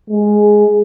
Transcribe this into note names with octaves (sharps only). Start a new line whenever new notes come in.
G#3